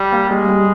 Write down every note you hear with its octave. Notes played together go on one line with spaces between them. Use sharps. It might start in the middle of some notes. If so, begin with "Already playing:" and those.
Already playing: G3
A#3
G3 G#3
G3